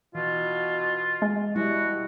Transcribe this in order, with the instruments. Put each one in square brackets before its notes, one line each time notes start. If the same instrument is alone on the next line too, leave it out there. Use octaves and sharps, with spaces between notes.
[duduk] B2 [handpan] E3 [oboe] F4
[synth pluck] G#3
[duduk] B2 [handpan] G3 E4 [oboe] F#4